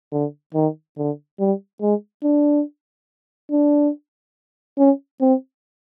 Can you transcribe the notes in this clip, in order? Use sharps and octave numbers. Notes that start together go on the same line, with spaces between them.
D3
D#3
D3
G3
G#3
D4
D4
C#4
C4